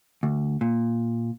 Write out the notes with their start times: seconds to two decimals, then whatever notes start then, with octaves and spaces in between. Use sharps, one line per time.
0.23 D2
0.61 A#2